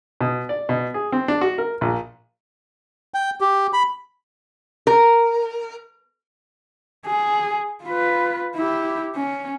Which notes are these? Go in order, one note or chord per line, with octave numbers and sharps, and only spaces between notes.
B2
D5
B2
G#4
C4
D4
F#4
A#4
A#1
G5
G4
B5
A#4
G#4
F4 B4
E4 G4
C#4